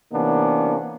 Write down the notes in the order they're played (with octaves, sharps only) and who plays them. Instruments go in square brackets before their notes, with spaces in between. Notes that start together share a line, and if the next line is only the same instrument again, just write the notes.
[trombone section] C3 E3 A#3 B3 C#4 D4